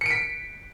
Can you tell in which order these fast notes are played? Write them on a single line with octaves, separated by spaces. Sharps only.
C#7 D7 B6